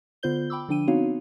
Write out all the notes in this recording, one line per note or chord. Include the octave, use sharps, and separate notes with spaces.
D3 B3 F4 C5 G6 G7
G5 B5 D6 E6
D3 F3 D4 G5 D#7
B3 C4 D#4 F#4 C#5 F5